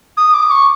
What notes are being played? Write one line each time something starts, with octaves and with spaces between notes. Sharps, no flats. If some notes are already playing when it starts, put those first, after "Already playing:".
D#6
D6
C#6